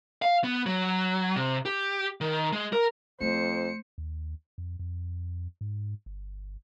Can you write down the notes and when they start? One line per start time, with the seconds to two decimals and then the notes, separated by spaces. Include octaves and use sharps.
0.22 F5
0.44 B3
0.66 F#3
1.36 C3
1.65 G4
2.21 D#3
2.53 G#3
2.73 A#4
3.21 F2 A3 C5 C#7
3.98 D#2
4.58 F2
4.79 F2
5.61 G#2
6.06 G1